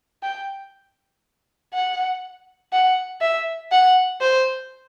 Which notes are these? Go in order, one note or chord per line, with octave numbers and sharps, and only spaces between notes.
G5
F#5
F#5
E5
F#5
C5